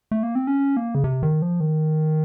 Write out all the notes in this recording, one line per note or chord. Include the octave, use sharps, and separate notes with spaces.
A3
A#3
C4
C#4
A#3
C#3
C3
D#3
F3
D#3